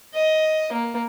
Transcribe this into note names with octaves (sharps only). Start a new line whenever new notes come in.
D#5
A#3